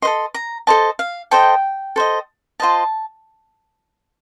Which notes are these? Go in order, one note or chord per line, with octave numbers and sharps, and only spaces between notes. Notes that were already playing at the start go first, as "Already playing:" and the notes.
A4 C5 D#5 C6
A#5
A4 C5 D#5 A5
F5
A4 C5 D#5 G5
A4 C5 D#5
F4 C5 D#5 A5